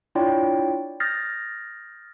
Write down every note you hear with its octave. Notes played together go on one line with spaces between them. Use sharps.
D4 E4 F4 C#5 D5 G5
D#6 F6 G6 A6 A#6 C7